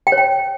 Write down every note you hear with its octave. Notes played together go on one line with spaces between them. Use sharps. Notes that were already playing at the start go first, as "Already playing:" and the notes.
G5
C#5
G5